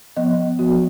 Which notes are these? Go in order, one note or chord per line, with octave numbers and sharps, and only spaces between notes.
F3 B3 D#5
F3 B3 F#4